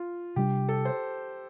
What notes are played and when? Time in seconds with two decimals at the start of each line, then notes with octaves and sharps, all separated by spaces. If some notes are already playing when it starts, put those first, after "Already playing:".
Already playing: F4
0.36 C3 G3 D4 G4
0.69 A4
0.85 C5